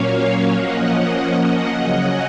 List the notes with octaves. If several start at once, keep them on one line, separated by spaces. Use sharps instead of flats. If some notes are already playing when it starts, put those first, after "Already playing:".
Already playing: A#2 F#3 A#3 C#4 C#5 F5
F3 A#3 C#4 D#5 F#5
C#3 F#3 C#4 D#5 F#5